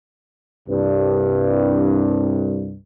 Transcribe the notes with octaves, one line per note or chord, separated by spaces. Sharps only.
C2 G2